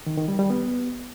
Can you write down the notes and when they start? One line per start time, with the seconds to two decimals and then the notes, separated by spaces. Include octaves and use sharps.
0.06 D#3
0.17 D#3
0.28 G3
0.39 G3
0.50 B3